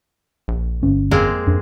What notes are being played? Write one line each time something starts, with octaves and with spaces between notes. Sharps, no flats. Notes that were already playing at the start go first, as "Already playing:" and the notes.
A#1
G1 C#4
F2 G#3 A#3 C4
F2 D4